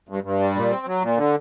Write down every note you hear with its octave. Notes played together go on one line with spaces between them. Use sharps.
G2
G2
G3
A#2
C4
F#3
A#2
D3